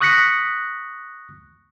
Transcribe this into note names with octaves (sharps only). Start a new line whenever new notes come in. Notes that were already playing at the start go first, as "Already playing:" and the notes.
C#6 D#6 F#6 A#6 B6 C#7